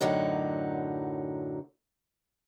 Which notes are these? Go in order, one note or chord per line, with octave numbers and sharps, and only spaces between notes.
F#2 A2 D3 F#3 D#4